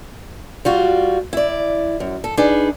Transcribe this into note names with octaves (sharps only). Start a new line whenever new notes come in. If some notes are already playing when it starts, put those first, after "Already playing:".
G3 F4 F#4
E4 D5
F#2
A4
D4 D#4 G#4 B4